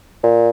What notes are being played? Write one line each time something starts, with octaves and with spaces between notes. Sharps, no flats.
A#2